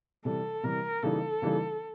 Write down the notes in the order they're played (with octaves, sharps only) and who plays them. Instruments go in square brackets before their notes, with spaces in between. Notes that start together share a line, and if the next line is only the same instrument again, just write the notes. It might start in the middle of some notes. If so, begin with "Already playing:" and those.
[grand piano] C3 E3 G3 [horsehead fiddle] A4
[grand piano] C3 E3 G3 [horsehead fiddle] A#4
[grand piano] C#3 E3 G3 A#3 D#4 [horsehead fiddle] A4
[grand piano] C#3 E3 G3 A#3 D#4